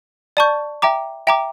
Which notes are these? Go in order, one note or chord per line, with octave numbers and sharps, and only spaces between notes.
D5 A5 C#6 G6
E5 G5 A#5 D6
E5 G5 A#5 D6